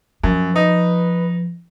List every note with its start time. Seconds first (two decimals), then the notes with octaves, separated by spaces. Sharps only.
0.24 F#2 F3
0.56 D#4 B4